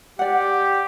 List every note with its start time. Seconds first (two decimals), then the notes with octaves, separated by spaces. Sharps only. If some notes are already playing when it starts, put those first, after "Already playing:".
0.19 G4 D5 F#5